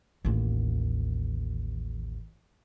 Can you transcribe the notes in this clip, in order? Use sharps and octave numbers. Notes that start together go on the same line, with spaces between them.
A1 D#2